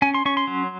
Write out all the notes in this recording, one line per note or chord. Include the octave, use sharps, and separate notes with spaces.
C#4 G#5
C6
C#4 C#6
C6
F#3